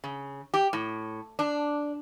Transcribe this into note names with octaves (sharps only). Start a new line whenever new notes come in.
C#3
G4
A2
D4